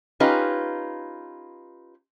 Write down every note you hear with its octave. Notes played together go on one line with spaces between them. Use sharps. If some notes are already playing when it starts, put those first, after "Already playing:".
C#4 D#4 F4 G4 B4